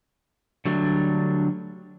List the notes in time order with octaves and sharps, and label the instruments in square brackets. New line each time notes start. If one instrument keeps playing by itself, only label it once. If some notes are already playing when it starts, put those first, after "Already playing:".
[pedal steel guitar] D3 F#3 G3 A3 D4